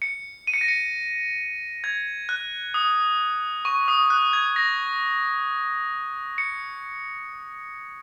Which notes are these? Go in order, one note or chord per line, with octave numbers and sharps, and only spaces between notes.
C#7
D#7
C#7
A#6
C#7
G#6
F#6
D#6
C#6
D#6
F#6
G#6
A#6
C#7